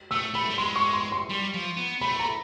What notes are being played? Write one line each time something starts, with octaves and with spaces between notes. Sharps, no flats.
A3 E6
A3 B5
G3
G#3 C6
C#6
C6
C6
G3
F3
B3
A3 B5
A#5